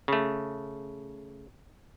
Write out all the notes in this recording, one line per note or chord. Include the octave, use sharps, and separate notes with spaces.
C#3 A3